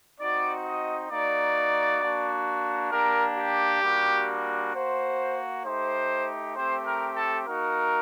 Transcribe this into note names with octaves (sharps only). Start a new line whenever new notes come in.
C4 D#4 F#4 D5
D#5
A#3 D#4 F#4 D5
A#3 D4 F#4
A#3 D4 G4 A#4
G4
G3 A#3 D4 F#4
A#3 F#4 C5
A3 D#4 G4 C5
A3 C4 G4 C5
A#4
A4
A#3 D#4 F#4 A#4